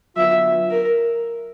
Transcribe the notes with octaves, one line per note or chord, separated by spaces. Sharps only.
D3 F#3 B3 D4 F4 E5
A#4